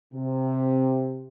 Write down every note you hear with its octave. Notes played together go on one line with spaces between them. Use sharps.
C3